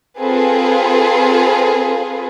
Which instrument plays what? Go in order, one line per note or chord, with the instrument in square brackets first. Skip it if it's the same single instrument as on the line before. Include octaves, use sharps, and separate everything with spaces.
[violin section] C4 F4 G#4 A4 B4